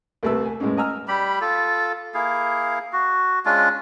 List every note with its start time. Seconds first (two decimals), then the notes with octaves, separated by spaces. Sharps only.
0.23 C2 C3 A3 B4 E6
0.45 G#5
0.60 A2 G#3 B3 C#4
0.77 D#5 G#5 A#5 E6 F6
1.08 G3 G4 B5
1.41 F4 A4
2.14 A#3 E4 G#4 F5
2.93 F#4
3.46 G#3 C#4 D4 F4